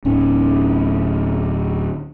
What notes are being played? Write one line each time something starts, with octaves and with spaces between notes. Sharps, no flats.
D1 C#4